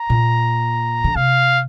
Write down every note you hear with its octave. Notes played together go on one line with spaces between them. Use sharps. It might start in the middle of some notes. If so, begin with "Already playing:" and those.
Already playing: A#5
A#2
D3
C3 F5